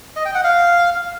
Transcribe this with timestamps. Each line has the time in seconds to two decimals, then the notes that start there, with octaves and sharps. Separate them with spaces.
0.16 D#5
0.25 G5
0.35 F#5
0.44 F5